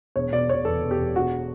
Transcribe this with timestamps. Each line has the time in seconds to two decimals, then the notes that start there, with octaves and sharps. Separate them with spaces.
0.16 E1 C#5
0.32 B2 D5
0.49 E1 C#5
0.65 E2 A4
0.82 E1
0.91 G4
0.98 E1
1.16 E1 F#4